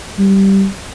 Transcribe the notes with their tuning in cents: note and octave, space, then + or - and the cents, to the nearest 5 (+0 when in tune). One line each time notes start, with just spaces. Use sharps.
G3 -10